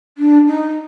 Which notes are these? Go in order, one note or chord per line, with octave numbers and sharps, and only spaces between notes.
D4
D#4